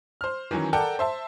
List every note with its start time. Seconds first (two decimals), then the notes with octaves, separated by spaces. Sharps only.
0.21 C5 F6
0.51 D#3 E3 F#3 C#4
0.73 A4 A#4 D5 F#5 G5 A5
0.99 C5 E5 A5